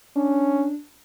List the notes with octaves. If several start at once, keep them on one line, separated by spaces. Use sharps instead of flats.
C#4 D4